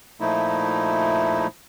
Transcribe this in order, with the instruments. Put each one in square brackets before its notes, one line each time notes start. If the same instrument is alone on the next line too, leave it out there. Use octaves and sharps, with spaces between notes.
[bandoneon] A#2 F3 A3 D#4 E4